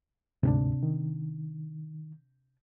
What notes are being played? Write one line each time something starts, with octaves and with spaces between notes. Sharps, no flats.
D2 G#2 C3 C4 D4
D#3